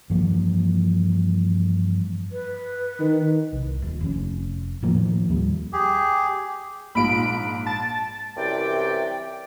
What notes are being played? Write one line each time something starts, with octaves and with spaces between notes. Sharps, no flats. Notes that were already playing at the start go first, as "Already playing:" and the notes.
G2 E3 F3 A#3
B4
D#3
C2
D#1
F1 C#4
A2 D#3 F3 A#3
D#2 G3
G4 G#4
A#1 G#2 B5 D7
A5 A6
C2 F#2 C3 E3 D5 G5